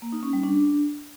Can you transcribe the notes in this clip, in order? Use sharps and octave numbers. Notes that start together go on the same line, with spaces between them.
A#3
D#4
C#4
G3
D4